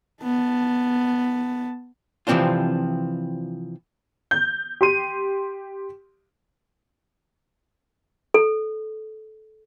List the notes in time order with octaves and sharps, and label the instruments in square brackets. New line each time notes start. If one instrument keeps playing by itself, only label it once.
[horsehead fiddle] B3 A5
[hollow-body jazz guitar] C3 E3 F3 C4 D4 F4
[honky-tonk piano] G6
G4 C6 D#7
[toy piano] A4